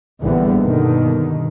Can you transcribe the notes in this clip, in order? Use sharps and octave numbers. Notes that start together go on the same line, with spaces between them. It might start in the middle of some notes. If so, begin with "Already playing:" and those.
A#1 E2 D3 E3 G3 B3
G2 B2 D3 D#3